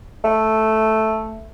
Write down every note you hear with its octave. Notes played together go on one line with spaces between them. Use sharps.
A3